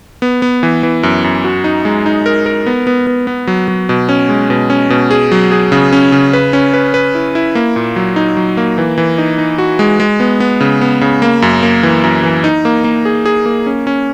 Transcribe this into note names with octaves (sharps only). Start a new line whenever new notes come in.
B3
B3
E3
E3
F#2
F#2
F#4
D#4
G#3
D#4
A#4
A#4
B3
B3
B3
B3
F#3
F#3
B2
C#4
G#3
B2
C#4
B2
G#4
F#3
G#4
C#3
C#4
C#3
B4
C#4
B4
B4
E4
E4
A#3
A#2
F#3
D#4
F#3
A#3
E3
E3
D#4
D#4
F#4
G#3
G#3
B3
B3
C#3
B3
C#3
A#3
F#2
A#3
E3
F#2
E3
D#4
A#3
A#3
G#4
G#4
A#3
C#4
C#4